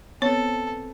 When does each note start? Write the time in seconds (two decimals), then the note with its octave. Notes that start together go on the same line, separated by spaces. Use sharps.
0.22 B3 C4 A4 C#5